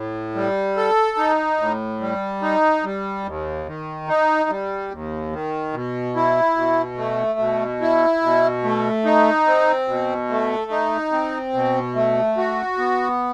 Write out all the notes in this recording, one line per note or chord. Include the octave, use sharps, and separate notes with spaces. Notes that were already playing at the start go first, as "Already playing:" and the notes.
Already playing: A2
G3
A4
D#4
A2
G3
D#4
G3
D#2
D#3
D#4
G3
D#2
D#3
B2
E4
B2
A3
B2
E4
B2
A3
D#4
C4
B2
A3
D#4
C4
B2
A3
F#4
B3